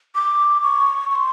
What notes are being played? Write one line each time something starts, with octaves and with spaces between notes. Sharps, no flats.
D6
C#6
C#6
C6